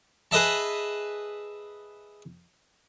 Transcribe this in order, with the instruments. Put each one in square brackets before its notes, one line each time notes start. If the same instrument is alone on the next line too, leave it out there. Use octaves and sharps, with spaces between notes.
[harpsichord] G#4 B4 D#5 E5 A5